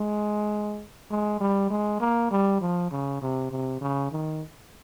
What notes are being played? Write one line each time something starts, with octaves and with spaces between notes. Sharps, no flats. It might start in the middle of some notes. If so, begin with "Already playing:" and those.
Already playing: G#3
G#3
G3
G#3
A#3
G3
F3
C#3
C3
C3
C#3
D#3